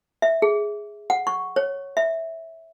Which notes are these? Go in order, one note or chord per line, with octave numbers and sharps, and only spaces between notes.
E5
G#4
F#5
C#6
C#5
E5